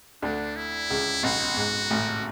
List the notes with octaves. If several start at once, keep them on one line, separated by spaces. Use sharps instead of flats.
D2 D3 D4
E4
C#2 C#3
B1 B2 F#4
G#2
A1 A2